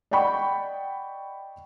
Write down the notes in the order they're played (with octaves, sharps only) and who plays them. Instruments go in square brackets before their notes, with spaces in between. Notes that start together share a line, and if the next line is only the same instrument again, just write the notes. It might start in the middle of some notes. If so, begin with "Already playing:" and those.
[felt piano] D5 D#5 F#5 G5 B5 C#6